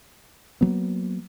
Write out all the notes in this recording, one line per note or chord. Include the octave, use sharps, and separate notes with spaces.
F#3 A#3 B3